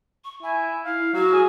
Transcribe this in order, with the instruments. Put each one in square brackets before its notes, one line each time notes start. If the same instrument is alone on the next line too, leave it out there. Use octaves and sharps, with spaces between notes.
[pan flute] C#6
[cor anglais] E4 [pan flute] G#5
[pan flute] E4 [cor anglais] F5
[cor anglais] F#3 [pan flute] F#4
[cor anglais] G#4